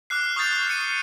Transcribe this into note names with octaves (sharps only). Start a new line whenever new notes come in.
D6 F6 F#6 C7
C#6 D#6 F6 G6 A6 C7
F6 C7 C#7 D#7